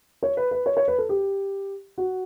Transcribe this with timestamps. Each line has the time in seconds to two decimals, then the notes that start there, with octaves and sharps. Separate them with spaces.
0.23 C#5
0.37 B4
0.51 B4
0.66 C#5
0.77 C#5
0.88 B4
0.98 A4
1.09 G4
1.98 F#4